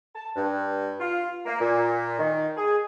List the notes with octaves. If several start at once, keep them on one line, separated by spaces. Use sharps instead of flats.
A5
G2
F4
A#3
A#2
D#3
G#4